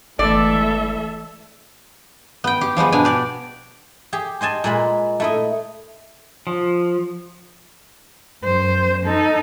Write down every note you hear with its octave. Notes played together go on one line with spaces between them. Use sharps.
G1 E3 G#3 A3 A4 D5 E5
B3 G5
G4
F3 G3 G#3 B3
B2 D4 G#5
G4 D5
G4 G#4
C5 D#5 G#5 A5
A#2 G#3 B5
A3 E4 D#5
F3
F#2 C5
D#4 A4